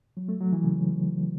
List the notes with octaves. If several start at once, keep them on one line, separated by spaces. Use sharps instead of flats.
F#3
A3
F#3
E3
C#3